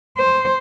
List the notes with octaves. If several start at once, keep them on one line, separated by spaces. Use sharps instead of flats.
C5